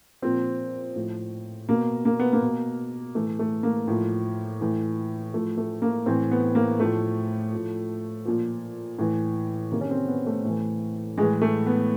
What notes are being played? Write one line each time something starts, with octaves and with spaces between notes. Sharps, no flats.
A#2 F3 C4
A2 F3
B2 A#3
A#3
B3
A#3
B2
A2 E3 A3
A3
A#3
A2 F3
A2 E3
A2 F3 A3
A3
A#3
A2 E3 C4
B3
A#3
A2 F3 A3
A2 F3
A#2 F3
A2 E3
C3 D#3 A#3
C#4
C4
B3
A3
A2 E3
A2 E3 G#3
A3
B3